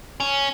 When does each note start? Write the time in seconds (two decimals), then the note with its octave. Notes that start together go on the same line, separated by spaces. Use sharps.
0.20 C#4